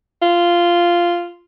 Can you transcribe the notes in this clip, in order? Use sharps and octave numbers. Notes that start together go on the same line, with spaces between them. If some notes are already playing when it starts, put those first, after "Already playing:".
F4